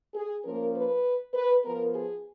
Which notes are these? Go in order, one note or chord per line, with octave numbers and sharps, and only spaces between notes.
G#4
F3 A#3 C#4 A#4
B4
B4
F3 B3 A#4
G#4